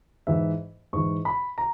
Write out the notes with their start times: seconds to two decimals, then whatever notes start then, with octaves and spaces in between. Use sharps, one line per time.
0.27 G#2 E3 E5
0.93 G#2 E3 C#6
1.25 B5
1.58 A#5